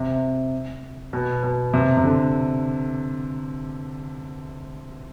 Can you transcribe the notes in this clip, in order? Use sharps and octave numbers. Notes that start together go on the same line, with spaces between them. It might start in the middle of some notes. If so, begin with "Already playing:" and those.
Already playing: C3
B2
B2
C3
C3
D3